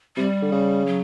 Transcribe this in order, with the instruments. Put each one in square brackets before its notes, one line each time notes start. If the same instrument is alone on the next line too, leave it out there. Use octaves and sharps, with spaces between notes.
[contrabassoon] C3 [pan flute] G3
[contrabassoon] D3
C#3
[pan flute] F#3